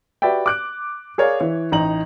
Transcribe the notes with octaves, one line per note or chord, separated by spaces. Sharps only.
F#4 G4 B4 D5 E5 G5
D6 F#6 D7
G#4 A#4 C#5 D5 F5
E3 C#5
A1 D#4 A#5 F#7